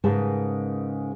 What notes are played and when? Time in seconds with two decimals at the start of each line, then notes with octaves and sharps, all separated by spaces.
0.04 G#2 C#3 G#3 A#4 B4 A5